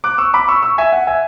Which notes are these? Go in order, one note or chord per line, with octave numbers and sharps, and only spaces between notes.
D6 F#6
C#6 E6
B5 D6
C#6 E6
C#6 E6
E5 G#5
F#5
E5 G#5